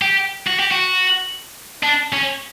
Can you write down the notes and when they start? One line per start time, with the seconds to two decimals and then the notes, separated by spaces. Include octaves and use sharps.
0.02 G4
0.47 F#4
0.60 G4
0.71 F#4
1.83 D4
2.12 C#4